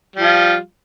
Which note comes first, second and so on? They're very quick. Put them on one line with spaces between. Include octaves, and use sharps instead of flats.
G3 F3 F4